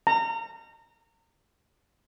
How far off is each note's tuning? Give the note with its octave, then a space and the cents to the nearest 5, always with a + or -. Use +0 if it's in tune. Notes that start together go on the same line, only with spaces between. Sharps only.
A#5 -30